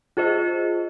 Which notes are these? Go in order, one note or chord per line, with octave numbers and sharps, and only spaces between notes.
F4 G#4 C5 D#5